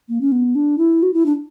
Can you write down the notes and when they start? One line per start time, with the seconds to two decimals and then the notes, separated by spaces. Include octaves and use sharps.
0.09 A#3
0.21 C#4
0.32 B3
0.55 D4
0.78 E4
1.03 F#4
1.14 E4
1.26 D4